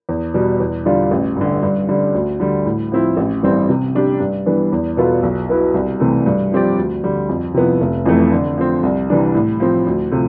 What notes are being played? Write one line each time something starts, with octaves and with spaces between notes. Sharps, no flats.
E2
B2 G3
E2
D3 G3 D4 F4
A1
G2 D3
G2
D3 G3
D2
D3 G3
A2
F3 C4 E4
A1
G2 E3 G3 C4
C3
G3 D4 G4
G2
E3 G3 B3 D4
E2
B2 B3 F4 A4
B1
B2 B3 E4 B4
C2
C3 E3 A3
G2
F3 C4 G4 D5
D2
D3 G3
F2
C3 F3 B3 E4
F1
F2 C3 E3 A3
D3
F3 C4
C2
C3 E3 G3 D4
A2
F3 C4
D2
C3 F3 A3